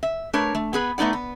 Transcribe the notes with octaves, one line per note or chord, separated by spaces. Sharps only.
E5
A3 D4 A#4 B4 C#5
A3
B3 G#4 B4
A3 B3 D#4 D5 F#5
B3